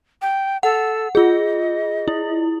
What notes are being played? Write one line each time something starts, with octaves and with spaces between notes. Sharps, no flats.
G5
A4 F#5
F4 G#4 D#5
E4